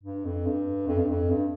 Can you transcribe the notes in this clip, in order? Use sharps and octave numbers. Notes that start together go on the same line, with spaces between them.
G2
F2
G2
F2
G2
F2
G2